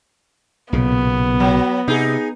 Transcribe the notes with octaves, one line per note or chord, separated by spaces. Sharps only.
B1 A#2 C#3 B3
F#3
C3 D#4 G#4